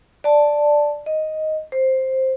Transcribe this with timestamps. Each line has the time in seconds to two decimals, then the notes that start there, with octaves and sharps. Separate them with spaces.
0.24 D5 A5
1.06 D#5
1.72 C5